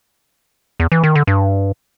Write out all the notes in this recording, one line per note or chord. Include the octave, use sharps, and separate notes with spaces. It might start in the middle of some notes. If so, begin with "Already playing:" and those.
E2
E3
D#3
D3
G2